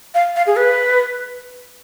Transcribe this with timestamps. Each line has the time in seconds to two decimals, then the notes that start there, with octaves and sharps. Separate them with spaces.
0.15 F5
0.36 F5
0.47 G#4
0.56 B4